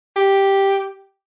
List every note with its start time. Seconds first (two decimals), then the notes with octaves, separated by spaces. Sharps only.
0.16 G4